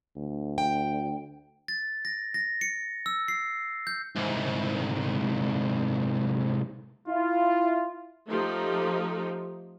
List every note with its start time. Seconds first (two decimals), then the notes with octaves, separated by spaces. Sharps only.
0.16 D2
0.58 G5
1.68 A6
2.05 A#6
2.34 A#6
2.61 C#7
3.06 E6
3.28 C7
3.87 G6
4.16 C2 G#2
7.08 E4 F4
8.28 F3 A3 D#4 G4